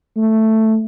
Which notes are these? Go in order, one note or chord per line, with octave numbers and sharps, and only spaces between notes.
A3